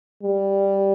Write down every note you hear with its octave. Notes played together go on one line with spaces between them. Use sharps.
G3